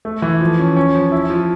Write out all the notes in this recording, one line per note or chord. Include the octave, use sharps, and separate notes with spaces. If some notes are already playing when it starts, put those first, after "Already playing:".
A3
E3
F3
C#4
C#4
F3
E4
F3